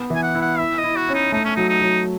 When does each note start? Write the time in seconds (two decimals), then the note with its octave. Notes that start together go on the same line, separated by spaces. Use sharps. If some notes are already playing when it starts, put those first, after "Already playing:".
Already playing: B3
0.10 E3 G#5
0.23 F#5
0.35 E4
0.42 F#5
0.59 E4 E5
0.78 D#5
0.84 E4
0.97 F#4
1.09 C#4
1.14 D#4
1.32 A3 D#4
1.45 C#4
1.56 F#3 D#4
1.69 D#4
1.81 F#3